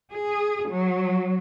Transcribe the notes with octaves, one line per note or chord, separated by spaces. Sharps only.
G#4
F#3